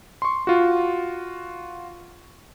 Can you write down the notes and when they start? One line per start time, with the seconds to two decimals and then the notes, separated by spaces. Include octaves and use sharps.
0.22 C6 C#6
0.47 F4 F#4